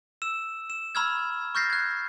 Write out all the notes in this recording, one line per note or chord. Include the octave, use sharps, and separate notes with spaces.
E6 E7
E7
A#5 B5 C#6 E6 F6 G#6
C#6 F6 G6 A6 A#6 C7
F#6 G#6